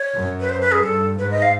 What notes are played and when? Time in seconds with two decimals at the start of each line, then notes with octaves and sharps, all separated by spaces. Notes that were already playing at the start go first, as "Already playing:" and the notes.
Already playing: C#5
0.15 F#2
0.40 B4
0.49 C5
0.61 B4
0.72 G#4
0.83 G2 A4
1.18 G#2 B4
1.31 D#5
1.42 F5